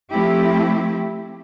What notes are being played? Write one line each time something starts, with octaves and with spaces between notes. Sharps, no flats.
F3 A3 C4 E4 G4